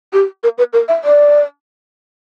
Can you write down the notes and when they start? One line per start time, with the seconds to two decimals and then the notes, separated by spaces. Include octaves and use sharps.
0.13 G4
0.44 A#4
0.58 B4
0.73 A#4
0.88 E5
1.04 D5